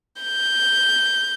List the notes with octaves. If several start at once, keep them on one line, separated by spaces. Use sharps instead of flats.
G6